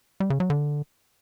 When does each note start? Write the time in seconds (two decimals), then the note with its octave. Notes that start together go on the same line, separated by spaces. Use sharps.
0.20 G3
0.30 C#3
0.40 F#3
0.50 D3